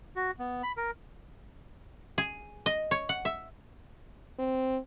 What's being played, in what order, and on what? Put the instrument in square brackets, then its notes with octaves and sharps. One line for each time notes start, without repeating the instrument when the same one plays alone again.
[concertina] F#4
B3
B5
A#4
[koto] G#4
D#5
C#5
F#5
E5
[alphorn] C4